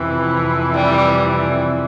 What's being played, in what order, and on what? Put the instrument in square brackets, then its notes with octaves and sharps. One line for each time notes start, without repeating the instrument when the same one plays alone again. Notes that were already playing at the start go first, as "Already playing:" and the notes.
Already playing: [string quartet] F2 C3 E3
G3